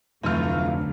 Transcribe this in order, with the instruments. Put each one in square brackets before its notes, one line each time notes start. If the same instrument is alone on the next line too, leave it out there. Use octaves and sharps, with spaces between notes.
[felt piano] F1 F6 [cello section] D2 D3 F#3 [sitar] E3 A3 F4